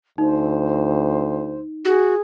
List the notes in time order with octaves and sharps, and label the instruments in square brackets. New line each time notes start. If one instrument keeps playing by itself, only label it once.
[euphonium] D2 [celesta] D#4 [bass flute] C5
[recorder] F#4 [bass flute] G#4